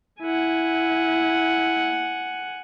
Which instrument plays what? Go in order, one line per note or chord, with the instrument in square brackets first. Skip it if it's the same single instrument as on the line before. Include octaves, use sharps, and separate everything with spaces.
[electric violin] E4 [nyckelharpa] F#5 G#5